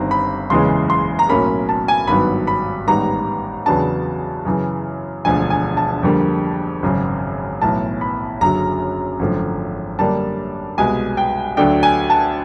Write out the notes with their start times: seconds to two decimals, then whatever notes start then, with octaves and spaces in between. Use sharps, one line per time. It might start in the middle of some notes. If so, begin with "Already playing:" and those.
Already playing: G1 G2 D#3 G3 C4 A#5
0.11 B5
0.50 F#1 E2 C#3 E3 G#3 C6
0.90 C6
1.19 A#5
1.29 B1 A2 F#3 A#3 C#4 B5
1.69 A5
1.88 G#5
2.07 G#1 G2 D#3 F#3 B3 B5
2.47 B5
2.87 A1 G#2 D#3 G3 B3 A#5
3.66 E2 C#3 F#3 B3 D4 A5
4.45 F#2 C#3 E3
5.25 E1 D2 D3 F3 G#5
5.50 G#5
5.77 A5
6.03 F2 D3 G3 A#3
6.82 G#1 F#2 C#3
7.61 B1 A2 E3 A5
8.01 B5
8.40 F#1 F#2 D3 F#3 A#5
9.19 G#1 F#2 D3 F3 A3
9.98 F#2 D3 G3 A#3 D4 A5
10.78 C2 B2 G#3 G#5
11.17 G5
11.57 D2 D3 F#3 A3 D4 G5
11.83 G#5
12.10 A5